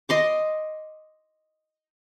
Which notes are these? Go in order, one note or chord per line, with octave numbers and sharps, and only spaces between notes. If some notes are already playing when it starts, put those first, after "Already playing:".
D#5 C6 D6